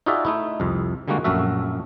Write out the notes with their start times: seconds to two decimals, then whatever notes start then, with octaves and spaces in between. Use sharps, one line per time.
0.06 D#4 F4 F#4 G#4 D5 E5
0.25 A3 D#4 E4
0.60 C2 F2
1.08 D3 G3 G#3 A#3 F#4
1.24 A#1 F#2 A3 F#4 E5